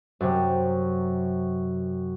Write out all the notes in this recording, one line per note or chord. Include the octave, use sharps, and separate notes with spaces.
F#2 C3